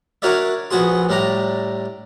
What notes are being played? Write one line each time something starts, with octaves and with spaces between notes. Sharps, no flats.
D4 F#4 A#4 C#5 D5 E5
A#1 B3 F#4 G#4 C6
A2 G3 D4 A#5